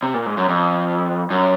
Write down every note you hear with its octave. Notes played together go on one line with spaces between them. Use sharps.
C3
A#2
G#2
F#2
F2
F#2